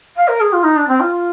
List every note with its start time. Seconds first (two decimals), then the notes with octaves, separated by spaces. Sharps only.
0.16 F5
0.28 A#4
0.41 G#4
0.53 F4
0.63 D#4
0.76 D4
0.88 C4
1.00 F4